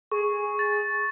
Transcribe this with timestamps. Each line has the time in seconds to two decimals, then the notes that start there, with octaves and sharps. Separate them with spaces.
0.12 G#4 C#6
0.59 A6